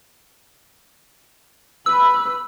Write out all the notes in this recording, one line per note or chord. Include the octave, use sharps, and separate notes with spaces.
B4 B5 E6